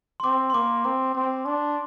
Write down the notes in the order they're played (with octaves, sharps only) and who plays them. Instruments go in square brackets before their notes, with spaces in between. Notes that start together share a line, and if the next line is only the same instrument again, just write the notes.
[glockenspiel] C6
[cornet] C4 [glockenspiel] D6
[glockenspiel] C6
[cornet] A#3 [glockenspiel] D6
[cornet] C4 [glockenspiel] D6
[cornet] C4
D4